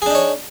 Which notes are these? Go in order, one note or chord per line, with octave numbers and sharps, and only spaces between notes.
D4 D#4 G#4 C#5